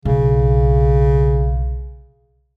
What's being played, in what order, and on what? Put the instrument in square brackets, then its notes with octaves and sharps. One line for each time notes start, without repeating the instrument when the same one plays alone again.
[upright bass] B1 [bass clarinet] C#3